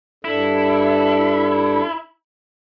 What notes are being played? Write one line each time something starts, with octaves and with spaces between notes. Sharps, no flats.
G2 D4 E4 A4